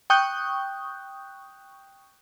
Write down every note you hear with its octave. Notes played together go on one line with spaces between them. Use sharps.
G5 C#6 D#6 F#6 G6